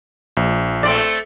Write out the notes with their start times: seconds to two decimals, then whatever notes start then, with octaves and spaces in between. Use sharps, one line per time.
0.37 A#1
0.83 A3 C4 D5